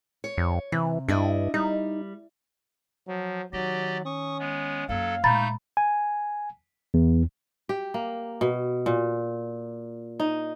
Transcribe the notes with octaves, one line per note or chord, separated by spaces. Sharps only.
C#5
F2
C3 E3
G2 D4 E4 D#5
G3 D#4
F3 F#3
D#3 F#3 G4 D5 D#5
C#4 C#6 D#6
G#3 B3
F#2 F#3 A#3 A4 F5
A#2 G#3 A3 D#4 A#5 B5 G6 A6
G#5
E2
G4
A#3
B2
A#2
D#4